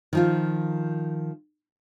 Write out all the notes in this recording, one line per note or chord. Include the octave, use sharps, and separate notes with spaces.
D#3 F3 F4